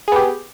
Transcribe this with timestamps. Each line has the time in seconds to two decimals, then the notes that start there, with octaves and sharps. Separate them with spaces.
0.08 G#4
0.12 B3
0.16 G4